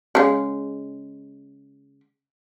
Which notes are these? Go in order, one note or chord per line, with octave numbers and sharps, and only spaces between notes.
C#3 G#3